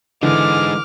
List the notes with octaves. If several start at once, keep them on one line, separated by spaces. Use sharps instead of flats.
D3 E3 G#3 D#4 D6 F6